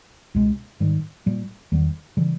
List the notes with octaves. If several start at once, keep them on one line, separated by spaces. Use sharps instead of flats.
C#2 B2 G#3
G#2 D#3 G3
A#2 G3 A#3
E2 D#3 G3 B3
C#3 E3 G3